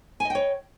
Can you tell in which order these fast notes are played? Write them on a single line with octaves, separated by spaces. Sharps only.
G#5 D#5 G5 C#5